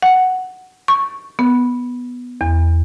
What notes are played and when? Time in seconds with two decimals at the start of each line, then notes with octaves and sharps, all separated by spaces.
0.02 F#5
0.88 C#6
1.39 B3
2.41 E2